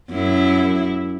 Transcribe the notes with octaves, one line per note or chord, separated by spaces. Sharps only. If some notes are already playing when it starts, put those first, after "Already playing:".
F#2 E4